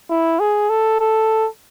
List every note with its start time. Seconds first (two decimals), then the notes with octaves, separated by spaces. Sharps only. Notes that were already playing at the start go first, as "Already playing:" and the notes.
0.10 E4
0.40 G#4
0.70 A4
1.00 A4